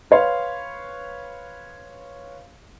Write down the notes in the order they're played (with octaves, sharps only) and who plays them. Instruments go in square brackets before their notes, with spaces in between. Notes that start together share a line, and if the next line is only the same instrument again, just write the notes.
[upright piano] B4 C#5 F5 C6